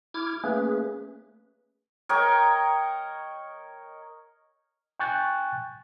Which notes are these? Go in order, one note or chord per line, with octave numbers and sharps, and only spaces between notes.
E4 D6 F6 G#6
A3 A#3 C#4 G#4 B4
A#4 C#5 D#5 G5
G5 G#5 C#6 F#6 G6 A6